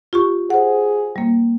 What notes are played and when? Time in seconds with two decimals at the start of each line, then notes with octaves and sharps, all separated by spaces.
0.13 F4 G4 C#6
0.50 G#4 C5 F#5
1.16 G3 A#3